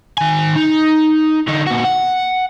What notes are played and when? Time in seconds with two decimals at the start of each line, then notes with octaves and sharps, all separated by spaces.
0.18 D#3 G#5
0.56 D#4
1.48 D3 D#4
1.67 A#2 F#4
1.84 F#5